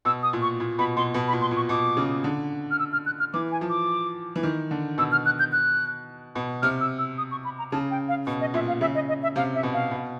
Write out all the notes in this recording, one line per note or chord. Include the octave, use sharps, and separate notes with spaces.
B2 E6
D#6
A#2
C#6
A#2
B2 B5
B2 C6
B2
B5
A#2
C6
A#2
C#6
B2 D6
C#3
D3
F6
E6
F6
F#6
F6
E3 D6
G#5
F3
D6
E3
D#3
D3
B2 E6
F6
F#6
G6
F#6
B2
C3 F6
E6
E6
D#6
C#6
B5
A#5
C#3 A5
G5
F5
B2
D#5
A#2 E5
F5
C#3 E5
D#5
D#5
E5
C3 F5
E5
B2
F5
B2